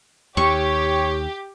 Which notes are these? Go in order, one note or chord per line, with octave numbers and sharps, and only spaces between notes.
D#2 G4 C#5 C#6